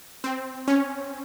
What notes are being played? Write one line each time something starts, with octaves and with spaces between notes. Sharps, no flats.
C4
C#4